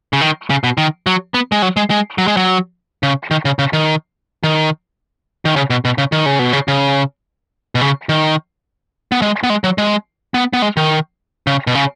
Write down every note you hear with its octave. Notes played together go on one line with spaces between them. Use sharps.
C#3
D#3
C#3
B2
D#3
F#3
B3
G#3
F#3
G#3
G#3
F#3
G#3
F#3
C#3
D#3
C#3
C#3
D#3
D#3
D#3
C#3
B2
B2
C#3
D#3
C#3
B2
C#3
C#3
B2
C#3
D#3
B3
G#3
B3
G#3
F#3
G#3
B3
B3
G#3
D#3
C#3
B2
C#3